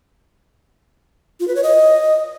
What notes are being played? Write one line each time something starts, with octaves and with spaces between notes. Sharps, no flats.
F4
B4
C#5
D#5